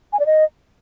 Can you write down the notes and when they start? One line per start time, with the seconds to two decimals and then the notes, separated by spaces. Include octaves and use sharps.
0.13 G#5
0.19 D5
0.26 D#5